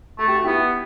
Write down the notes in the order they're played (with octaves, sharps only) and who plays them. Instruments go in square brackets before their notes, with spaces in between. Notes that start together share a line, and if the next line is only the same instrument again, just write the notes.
[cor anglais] A3 [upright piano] A4
[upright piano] G4
F#4
[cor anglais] B3 [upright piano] E4 G4